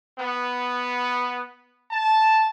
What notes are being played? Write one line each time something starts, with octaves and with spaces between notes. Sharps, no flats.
B3
A5